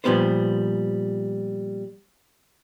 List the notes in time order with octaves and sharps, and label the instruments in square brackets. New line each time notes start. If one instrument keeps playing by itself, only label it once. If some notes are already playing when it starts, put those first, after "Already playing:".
[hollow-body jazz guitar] A#2 F3 G3 B3 B4 C5